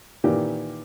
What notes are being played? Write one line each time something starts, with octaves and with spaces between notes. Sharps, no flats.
A#2 D#3 E3 G4